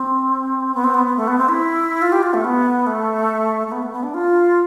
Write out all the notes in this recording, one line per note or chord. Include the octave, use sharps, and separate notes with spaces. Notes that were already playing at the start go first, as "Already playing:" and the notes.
Already playing: C4
B3
C4
B3
B3
A3
B3
C4
E4
F4
G4
F4
A3
B3
A3
A3
B3
A3
B3
D4
F4